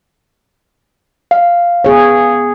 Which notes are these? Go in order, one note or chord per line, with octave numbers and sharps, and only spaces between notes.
F5
B3 G#4 C#5